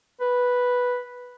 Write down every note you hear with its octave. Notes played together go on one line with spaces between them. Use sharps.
B4